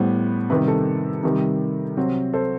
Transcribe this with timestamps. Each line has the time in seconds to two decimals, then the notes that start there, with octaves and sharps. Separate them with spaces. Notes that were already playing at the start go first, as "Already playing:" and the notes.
Already playing: A2 G3 B3 C5
0.50 C3 D#3 G3 B4
0.68 A4
1.23 C3 D#3 G3
1.97 C3 F#3 C4
2.33 A4 C5